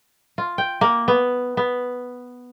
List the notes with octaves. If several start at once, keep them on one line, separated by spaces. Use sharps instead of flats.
F4
G5
A#3
B3
B3